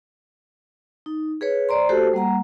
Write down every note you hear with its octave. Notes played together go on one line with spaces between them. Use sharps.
D#4
G#4 B4 C#5
C5 D5 A#5 C6
A3 F#4 G4 A4 C5 A5
G3 A#3 F#5 A#5